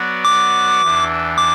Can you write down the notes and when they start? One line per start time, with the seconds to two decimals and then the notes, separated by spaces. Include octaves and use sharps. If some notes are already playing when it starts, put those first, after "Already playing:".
Already playing: F#3 B3 F#4 D5
0.25 D6
0.82 E2 E3 D4
1.38 D6